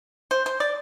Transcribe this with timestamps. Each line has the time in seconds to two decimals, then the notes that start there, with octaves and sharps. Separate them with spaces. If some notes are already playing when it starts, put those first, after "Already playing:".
0.31 C5
0.46 C5
0.60 D5